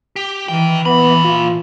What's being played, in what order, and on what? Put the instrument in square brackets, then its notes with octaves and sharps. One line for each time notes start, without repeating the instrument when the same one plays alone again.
[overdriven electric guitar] G4
[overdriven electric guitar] D#3 G5 [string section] E3
[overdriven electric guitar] A#2 B5 [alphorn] B3
[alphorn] F4